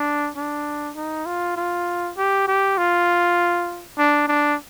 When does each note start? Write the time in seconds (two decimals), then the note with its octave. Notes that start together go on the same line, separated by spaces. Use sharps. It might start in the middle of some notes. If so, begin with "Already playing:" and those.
Already playing: D4
0.37 D4
0.96 D#4
1.26 F4
1.57 F4
2.18 G4
2.48 G4
2.78 F4
3.98 D4
4.28 D4